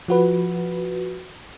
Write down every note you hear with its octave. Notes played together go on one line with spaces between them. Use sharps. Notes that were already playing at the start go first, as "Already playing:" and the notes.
F3 F#4 B4